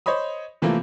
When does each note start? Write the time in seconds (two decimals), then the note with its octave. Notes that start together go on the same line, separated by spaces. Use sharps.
0.06 C5 C#5 D#5 B5 D#6
0.62 C3 E3 F3 A3 A#3 C4